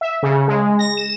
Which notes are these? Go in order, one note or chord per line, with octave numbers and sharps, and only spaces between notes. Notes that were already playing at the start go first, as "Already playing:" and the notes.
E5
C#3
G#3
A#6
E7